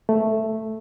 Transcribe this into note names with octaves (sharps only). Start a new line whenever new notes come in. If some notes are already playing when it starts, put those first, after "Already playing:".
A3